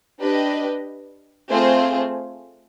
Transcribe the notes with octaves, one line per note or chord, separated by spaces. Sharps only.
D4 G4 B4 D#5
A3 C4 F4 G#4 C5